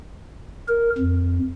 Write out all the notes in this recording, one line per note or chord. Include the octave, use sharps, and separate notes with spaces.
A#4
F2